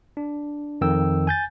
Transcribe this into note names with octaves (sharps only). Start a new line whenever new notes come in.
D4
F2 D#3 G5 E6
G#5 G6 A6